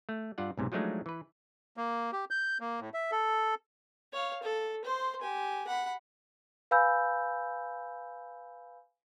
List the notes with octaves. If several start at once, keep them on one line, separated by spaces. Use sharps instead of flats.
A3
G2 F4 D5 F#5
B1 G#2 C3
F3 F#3 G#3 A3 D4 D#4
E3 B4
A#3
G4
G6
A#3
A2
E5
A4
C#5 F5
A4
C5 C6
G4 G#5
F#5 B5
B4 F5 G#5 B5 E6 G6